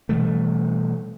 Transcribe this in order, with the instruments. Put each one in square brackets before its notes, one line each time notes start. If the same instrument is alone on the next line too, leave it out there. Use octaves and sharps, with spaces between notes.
[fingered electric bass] B2 E3 G3 A3